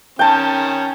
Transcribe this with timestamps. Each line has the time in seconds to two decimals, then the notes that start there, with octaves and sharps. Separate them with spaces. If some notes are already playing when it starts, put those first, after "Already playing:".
0.19 D#3 C#4 G5 A5